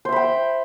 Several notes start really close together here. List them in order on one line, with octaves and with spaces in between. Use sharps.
C5 E5 B5 G5